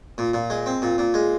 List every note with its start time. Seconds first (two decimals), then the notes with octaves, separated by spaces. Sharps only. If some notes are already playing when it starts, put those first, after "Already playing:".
0.18 A#2
0.33 A#2
0.50 G#3
0.66 C4
0.82 A#2
0.98 A#2
1.14 G#3